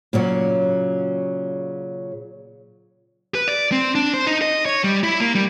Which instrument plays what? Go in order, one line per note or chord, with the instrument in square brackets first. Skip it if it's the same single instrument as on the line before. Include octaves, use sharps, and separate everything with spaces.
[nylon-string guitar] A#2 C#3 F#3 F#4
[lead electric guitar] B4
D5
C4
D4
C5
D#4
D#5
C#5
G3
E4
A#3
G3